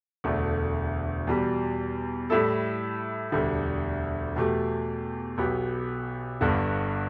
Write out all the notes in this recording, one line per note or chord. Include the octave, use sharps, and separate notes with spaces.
E1 D2 D3 A3 D4
E2 B2 G3
A2 G3 E4 A4
E1 D2 D3 G3
E2 B2 A3 G4
B1 B2 B3 G4
G1 G2 D3 B3